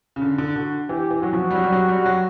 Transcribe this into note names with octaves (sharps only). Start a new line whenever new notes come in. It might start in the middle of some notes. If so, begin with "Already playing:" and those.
C#3
D3
D3
D3 F#4
E3 G4
E3
F#3 F#4
F3
G3
F#3
G3
F#3
G3
F#3